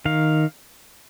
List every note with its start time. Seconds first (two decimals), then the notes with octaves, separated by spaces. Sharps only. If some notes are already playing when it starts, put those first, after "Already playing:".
0.05 D#3 F5